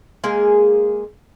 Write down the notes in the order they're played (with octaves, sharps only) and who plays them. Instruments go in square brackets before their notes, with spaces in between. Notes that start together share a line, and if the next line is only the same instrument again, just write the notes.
[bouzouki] G#3 A#3 G#4